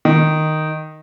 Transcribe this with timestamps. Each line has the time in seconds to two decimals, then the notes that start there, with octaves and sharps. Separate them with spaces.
0.05 D#3